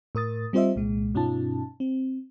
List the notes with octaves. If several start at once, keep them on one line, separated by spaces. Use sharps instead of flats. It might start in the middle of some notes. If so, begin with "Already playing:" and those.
A2 A#4 D#6 A6
G3 C4 F4 C5 D#5 E5
C2 A#2 G#3
G2 B2 C#4 D#4 F4 A5
C4